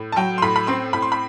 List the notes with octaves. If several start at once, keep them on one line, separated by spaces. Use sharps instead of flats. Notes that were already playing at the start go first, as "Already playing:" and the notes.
Already playing: A2
A5
F#3 G5
C6
A2 B5
B5
C4 C6
A2 B5
C6
B5